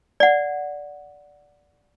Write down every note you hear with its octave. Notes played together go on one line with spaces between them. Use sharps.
D5 F#5